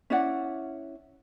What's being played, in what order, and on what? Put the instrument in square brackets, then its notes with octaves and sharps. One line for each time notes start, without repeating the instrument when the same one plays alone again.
[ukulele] C#4 E4 D5 F#5